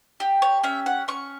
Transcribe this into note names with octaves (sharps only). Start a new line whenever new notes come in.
G4
C#5
C#4 E5
F#5
C#4 C#6